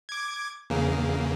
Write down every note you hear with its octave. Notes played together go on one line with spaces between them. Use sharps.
D6 G#6
E2 C#3 A#3